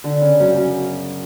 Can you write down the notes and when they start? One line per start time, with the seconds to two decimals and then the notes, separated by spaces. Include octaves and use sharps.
0.04 D3
0.21 C#3
0.40 F#2
0.57 F#2